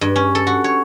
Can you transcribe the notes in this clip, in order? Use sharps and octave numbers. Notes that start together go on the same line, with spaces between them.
G2
C#4
A4
F#4
C#5